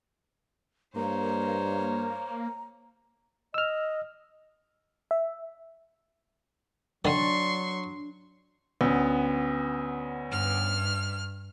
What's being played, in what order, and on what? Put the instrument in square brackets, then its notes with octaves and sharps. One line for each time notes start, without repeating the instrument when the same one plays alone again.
[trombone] G2 [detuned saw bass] A#3 [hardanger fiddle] C5 C#5 [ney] A#5
[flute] D#5 [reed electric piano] E6 F6
[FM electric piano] E5
[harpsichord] D3 D#3 [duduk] F#3 [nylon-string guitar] D4 [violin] C6 C#6
[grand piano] D2 [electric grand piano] B3 C#4
[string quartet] G2 F6